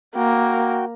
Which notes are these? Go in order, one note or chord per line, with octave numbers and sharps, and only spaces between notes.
A#3 F#4 G5